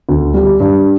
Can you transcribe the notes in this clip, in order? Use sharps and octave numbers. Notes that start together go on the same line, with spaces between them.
D2
G3
G2